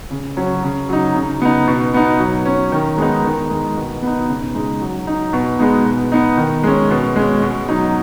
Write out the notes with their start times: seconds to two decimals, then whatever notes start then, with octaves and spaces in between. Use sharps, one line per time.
0.11 C#3
0.37 F#3 C#4
0.63 C#3
0.89 F#3 D#4
1.15 C#3
1.42 B3 D#4
1.67 B2
1.94 B3 D#4
2.19 F#3
2.46 C#4
2.72 D#3
2.98 G#3 B3 D#4
3.25 D#3
3.50 G#3 D#4
3.77 B2
4.02 B3 D#4
4.28 C#3
4.54 G#3 D#4
4.81 F#3
5.07 D#4
5.33 B2
5.59 G#3 B3 D#4
5.85 B2
6.12 B3 D#4
6.37 D#3
6.63 G#3 C#4
6.90 B2
7.16 G#3 C#4
7.42 B2
7.69 F#3 D#4